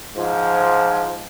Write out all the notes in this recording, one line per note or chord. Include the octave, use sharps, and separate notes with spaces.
G#2 F3